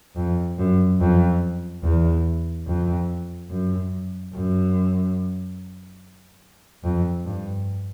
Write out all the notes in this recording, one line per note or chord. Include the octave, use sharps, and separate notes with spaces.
F2
F#2
F2
E2
F2
F#2
F#2
F2
G2